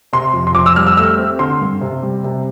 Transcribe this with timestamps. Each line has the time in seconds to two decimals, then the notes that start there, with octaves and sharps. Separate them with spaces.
0.13 C3 C6
0.33 F2
0.47 C6
0.55 F2 D6
0.66 E6
0.76 G3 F6
0.87 E6
0.97 A3 E6
1.19 C4
1.39 D3 C6
1.61 G2
1.81 C3
2.03 G3
2.24 C3